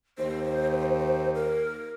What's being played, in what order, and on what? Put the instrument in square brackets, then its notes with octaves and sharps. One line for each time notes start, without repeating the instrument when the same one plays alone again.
[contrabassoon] D#2 [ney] C5
[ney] A#4